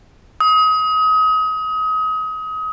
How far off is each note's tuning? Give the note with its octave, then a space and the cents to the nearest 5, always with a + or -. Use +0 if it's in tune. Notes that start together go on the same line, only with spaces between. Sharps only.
D#6 +30